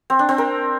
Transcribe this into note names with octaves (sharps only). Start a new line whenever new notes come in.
C4
D4
C4
A#4